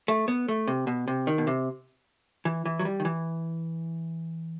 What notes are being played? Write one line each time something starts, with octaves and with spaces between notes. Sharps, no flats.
A3
B3
A3
C3
B2
C3
D#3
B2
C3
E3
E3
F#3
G3
D#3
E3